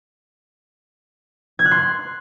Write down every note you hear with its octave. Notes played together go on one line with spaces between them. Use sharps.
G#6
F#6
C6